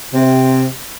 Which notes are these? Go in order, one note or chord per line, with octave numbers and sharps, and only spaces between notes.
C3